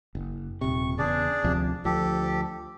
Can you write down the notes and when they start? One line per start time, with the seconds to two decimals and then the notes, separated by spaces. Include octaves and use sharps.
0.15 F#1
0.61 D#1 C3 C#6
0.98 E2 C#3 D4 G#4 D5
1.44 D2 C3 F3
1.85 D2 F3 G4 A4